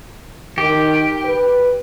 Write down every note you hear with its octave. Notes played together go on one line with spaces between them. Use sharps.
D#3 G4
B4